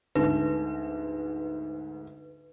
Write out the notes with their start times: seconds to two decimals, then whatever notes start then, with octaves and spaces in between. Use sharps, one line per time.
0.15 D2 G#2 B4